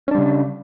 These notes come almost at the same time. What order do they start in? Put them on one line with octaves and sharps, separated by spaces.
C#4 D4 G3 C#3